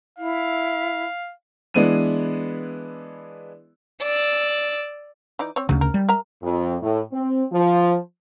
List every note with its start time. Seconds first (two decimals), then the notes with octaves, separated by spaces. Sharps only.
0.18 E4 F5
1.74 E3 G#3 B3 D4 E4 D#7
4.02 D5 E6
5.39 E3 D#4 D5
5.56 C4 C#5
5.69 D2 C#3 F#3
5.81 A#4
5.94 G3
6.09 A#4 E5 A#5
6.43 F2
6.82 A2
7.12 C4
7.53 F3